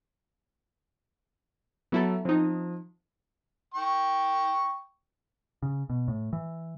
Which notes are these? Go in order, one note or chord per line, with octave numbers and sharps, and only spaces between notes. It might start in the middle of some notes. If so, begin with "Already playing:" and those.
F#3 B3 E4 A4
F3 C4 D#4
G5 C#6
C#3
B2
A2
E3